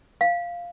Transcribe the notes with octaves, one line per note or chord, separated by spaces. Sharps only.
F5